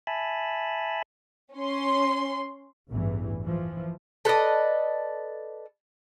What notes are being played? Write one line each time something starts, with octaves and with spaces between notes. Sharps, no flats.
E5 G#5 A5 B5
C#4 C6
A1 E2 G2 E3
E3 F3
A4 B4 D5 D#5